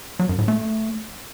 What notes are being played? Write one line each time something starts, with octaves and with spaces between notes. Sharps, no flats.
F#3
F#2
A2
A3